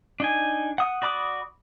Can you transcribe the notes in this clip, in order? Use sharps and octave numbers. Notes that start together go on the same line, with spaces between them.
D4 D#4 G#5
F#5 D#6
F#4 D5 B5 D6 D#6